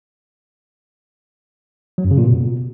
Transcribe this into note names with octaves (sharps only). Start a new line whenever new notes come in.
F#3
F#2
C#3
A#2
B2